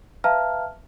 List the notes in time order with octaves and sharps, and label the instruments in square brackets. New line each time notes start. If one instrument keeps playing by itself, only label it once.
[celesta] B4 E5 F5 A5 A#5 F6